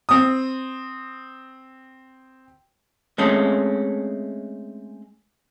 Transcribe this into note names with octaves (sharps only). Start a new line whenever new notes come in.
C4 D#6
G#3 A3 C4 C#4